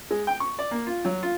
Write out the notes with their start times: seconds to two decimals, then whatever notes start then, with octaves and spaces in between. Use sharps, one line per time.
0.11 G#3
0.27 G5
0.40 C#6
0.59 D5
0.71 A#3
0.87 F4
1.05 F#3
1.23 F4